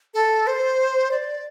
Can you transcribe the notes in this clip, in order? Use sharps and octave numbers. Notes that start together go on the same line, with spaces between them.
A4
C5
D5